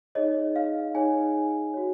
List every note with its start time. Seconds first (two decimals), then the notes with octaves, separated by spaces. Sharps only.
0.15 D#4 G#4 C#5 D#5
0.56 F5
0.94 D#4 G#4 C#5 G#5
1.74 F#4 C#5